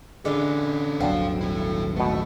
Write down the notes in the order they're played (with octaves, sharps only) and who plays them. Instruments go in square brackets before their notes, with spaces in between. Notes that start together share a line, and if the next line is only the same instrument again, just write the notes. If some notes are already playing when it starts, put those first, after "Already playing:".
[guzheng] D3 F4 B4 [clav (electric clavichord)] G#3 [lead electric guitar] C#4 A4
[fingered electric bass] D#1 G#1 F#3 [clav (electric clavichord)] B3 D4 [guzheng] C4 [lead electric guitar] C5 F5
[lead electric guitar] E4 A4
[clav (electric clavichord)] B2 B3 [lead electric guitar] A3